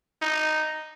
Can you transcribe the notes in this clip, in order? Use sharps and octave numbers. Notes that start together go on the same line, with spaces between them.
D#4